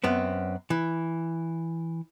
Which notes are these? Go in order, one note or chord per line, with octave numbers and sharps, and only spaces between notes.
F#2 B3 C4
E3